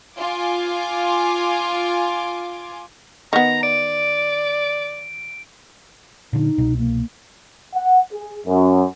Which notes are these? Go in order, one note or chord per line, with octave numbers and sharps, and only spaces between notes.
F4 G#5 D6
D#3 B3 A#5
D5 D7
A#2 D3 D#4
C2 B2
A#3
F#5
G#4
F#2